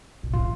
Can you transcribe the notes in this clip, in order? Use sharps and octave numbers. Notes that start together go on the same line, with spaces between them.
A#2
A2 F4